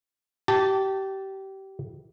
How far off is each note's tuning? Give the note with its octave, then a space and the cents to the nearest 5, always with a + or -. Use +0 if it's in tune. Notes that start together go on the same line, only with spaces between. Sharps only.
G4 -25 A5 +0